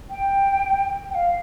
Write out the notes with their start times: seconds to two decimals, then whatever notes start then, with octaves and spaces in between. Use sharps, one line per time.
0.10 G5
1.10 G5
1.15 F5